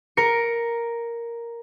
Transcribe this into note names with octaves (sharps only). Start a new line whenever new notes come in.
A#4 C#7